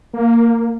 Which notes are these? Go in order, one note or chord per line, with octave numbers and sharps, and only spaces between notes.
A#3